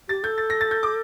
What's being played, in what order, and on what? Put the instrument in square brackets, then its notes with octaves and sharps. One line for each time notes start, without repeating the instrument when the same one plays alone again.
[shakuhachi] G4 [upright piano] A6
[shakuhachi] A4 [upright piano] G6
[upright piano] A6
A#6
A6
G6
D6